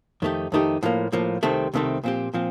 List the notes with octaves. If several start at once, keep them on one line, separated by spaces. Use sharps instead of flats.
F2 D#3 A3 D#4 G4
F2 D#3 A3 D#4 G4
A2 F3 A#3
A2 F3 A#3
C2 C3 D#3 A3 C4
C2 C3 D#3 A3 C4
A#2 F3 C4 G4
A#2 F3 C4